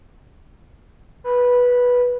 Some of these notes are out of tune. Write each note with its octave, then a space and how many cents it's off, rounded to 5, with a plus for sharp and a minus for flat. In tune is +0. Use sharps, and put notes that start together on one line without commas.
B4 -10